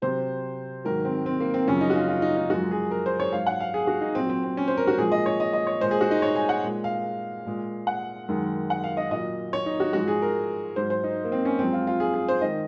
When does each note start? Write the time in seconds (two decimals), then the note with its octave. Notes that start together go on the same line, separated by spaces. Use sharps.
0.02 C3 F#3 C5
0.85 G#2 D#3 F#3 A#4
1.05 C4
1.26 C4
1.40 A#3
1.54 C4
1.67 F#2 C#3 F3 C#4
1.81 D#4
1.90 F#4
1.95 F4
2.08 F4
2.22 D#4
2.36 D#4
2.50 F#2 F3 G#3 F#4
2.71 G#4
2.91 A#4
3.06 C5
3.20 C#5
3.33 G#2 F#3 F5
3.46 F#5
3.60 F5
3.74 G#4
3.87 F#4
4.01 D#4
4.15 A#2 F#3 C4
4.30 C4
4.44 C4
4.57 C#4
4.68 C5
4.77 A#4
4.87 F#4
4.98 A#2 F3 G#3 G#4
5.12 D#5
5.26 C#5
5.40 D#5
5.53 D#5
5.67 C#5
5.80 A#2 G#3 C5
5.91 G#4
6.01 F#4
6.11 D#4
6.22 C#5
6.36 G#5
6.49 F#5
6.64 A#2 G#3
6.84 F5
7.46 A#2 G#3
7.87 F#5
8.28 F#2 D#3 G#3
8.70 F#5
8.84 F5
8.97 D#5
9.11 A#2 F#3 D#5
9.53 C#5
9.66 D#4
9.80 F#4
9.93 G#2 F3 G#3 F#4
10.08 G#4
10.22 A#4
10.76 G#2 F#3 C5
10.90 C5
11.04 D#4
11.24 A#3
11.32 C4
11.45 C#4
11.59 F#2 F3 G#3 C4
11.73 F4
11.87 F4
12.00 G#4
12.14 G#4
12.28 C5
12.41 D#3 G#3 D#5